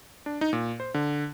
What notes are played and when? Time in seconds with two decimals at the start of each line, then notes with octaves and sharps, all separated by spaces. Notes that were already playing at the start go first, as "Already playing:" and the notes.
0.26 D4
0.41 D#4
0.53 A#2
0.80 C5
0.94 D3